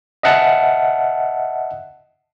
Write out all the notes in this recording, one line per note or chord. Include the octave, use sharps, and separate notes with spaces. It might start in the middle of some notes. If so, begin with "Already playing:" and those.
D#5 E5 F#5 A5